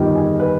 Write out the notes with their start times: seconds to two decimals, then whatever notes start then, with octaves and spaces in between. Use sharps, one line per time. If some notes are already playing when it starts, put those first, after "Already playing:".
Already playing: G1 F2 D#3 G3
0.15 G#4
0.39 B4